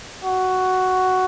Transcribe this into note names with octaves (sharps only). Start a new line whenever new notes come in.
F#4